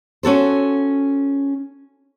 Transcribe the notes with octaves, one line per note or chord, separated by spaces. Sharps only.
C#4 F#4 A4 C5